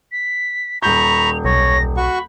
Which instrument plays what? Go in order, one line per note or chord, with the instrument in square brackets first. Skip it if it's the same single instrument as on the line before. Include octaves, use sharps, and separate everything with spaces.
[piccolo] B6
[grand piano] D#1 G6 [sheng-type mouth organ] A#5 B5 C#6 [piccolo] F7
[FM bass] B1 [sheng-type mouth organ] C#5 [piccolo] A#6
[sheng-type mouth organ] F#4 C#6 [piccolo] B5